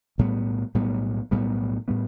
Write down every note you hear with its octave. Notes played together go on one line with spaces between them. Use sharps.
B1 A2 G3 B3
B1 A2 G3 B3
B1 A2 G3 B3
A2 G3 B3